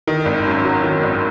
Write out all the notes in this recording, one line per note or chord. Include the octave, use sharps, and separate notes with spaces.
D#3
G#1
F#2
F#3
D#3
G#1